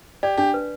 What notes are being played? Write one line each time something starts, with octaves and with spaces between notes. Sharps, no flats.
G4 D5
D4 G4
B4